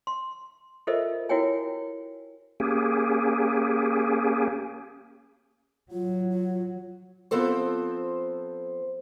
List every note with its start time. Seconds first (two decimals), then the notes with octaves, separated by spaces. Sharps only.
0.07 C6
0.87 F4 A4 A#4 C5 D#5 E5
1.29 E4 F#4 A#4 C#5 G5 G#5
2.60 A#3 C#4 G4 G#4
5.91 F#3 F4
6.30 F4
7.31 F3 B3 C4 A4 C5